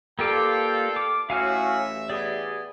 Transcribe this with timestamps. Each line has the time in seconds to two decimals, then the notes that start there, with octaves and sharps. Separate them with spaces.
0.19 A#3 F4 G4 A4 B4 D5 G5 D6
0.96 D6
1.30 A1 A2 F#3 F#4 E5 F5 G#5 F6
2.10 B3 G4 G#4 D5